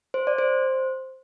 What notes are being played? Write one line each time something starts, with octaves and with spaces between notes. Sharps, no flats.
C5
D5
C5